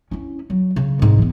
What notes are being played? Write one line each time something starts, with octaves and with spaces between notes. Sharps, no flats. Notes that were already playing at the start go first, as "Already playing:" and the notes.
C#4 E4
F#3
C#3
C2 G#2
E3 B3